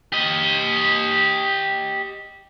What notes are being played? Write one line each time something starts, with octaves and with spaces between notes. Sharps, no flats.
G4 D#5